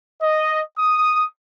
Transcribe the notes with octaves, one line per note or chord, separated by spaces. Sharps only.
D#5
D#6